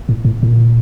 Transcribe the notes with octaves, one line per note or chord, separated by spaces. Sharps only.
A2
A2
A2
A#2